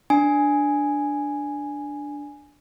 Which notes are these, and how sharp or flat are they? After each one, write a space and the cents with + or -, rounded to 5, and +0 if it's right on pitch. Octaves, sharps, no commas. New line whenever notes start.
D4 +0 G#5 +0